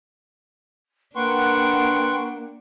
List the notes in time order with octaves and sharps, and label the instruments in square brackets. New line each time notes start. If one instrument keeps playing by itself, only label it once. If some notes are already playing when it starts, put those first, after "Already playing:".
[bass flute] A#3 [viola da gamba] D4 [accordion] B4 C6 C#6 [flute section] F#5 G5